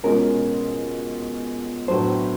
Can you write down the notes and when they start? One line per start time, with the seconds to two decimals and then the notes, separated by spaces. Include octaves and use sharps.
0.03 B2 G#3 C#4 F4 A#4
1.88 A2 F#3 B3 D4 C5